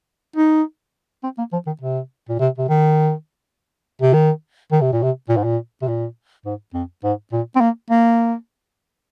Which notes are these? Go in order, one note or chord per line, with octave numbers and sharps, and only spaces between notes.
D#4
C4
A#3
F3
D#3
C3
A#2
C3
C3
D#3
C3
D#3
D#3
C3
A#2
C3
A#2
G#2
A#2
C3
A#2
G#2
F2
G#2
A#2
C4
A#3
A#3